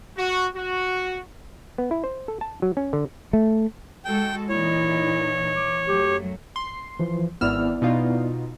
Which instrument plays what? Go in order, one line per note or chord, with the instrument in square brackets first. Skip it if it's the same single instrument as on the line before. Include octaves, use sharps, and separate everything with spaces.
[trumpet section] F#4
F#4
[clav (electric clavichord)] B3
E4
C5
A4
A5
F#3
C#4
D3
[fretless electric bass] A3
[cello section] G#3 F#4 A4 [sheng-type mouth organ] G5
[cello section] A#2 E3 D#4 [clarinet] E4 [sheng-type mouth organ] C#5
[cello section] E3 [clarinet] D6
[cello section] F#2 F#3 A3 [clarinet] G4
[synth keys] C6
[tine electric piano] E3 F3
[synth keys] G#1 E6 F6 [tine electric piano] B3 E4 D5
[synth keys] B2 D#4 F4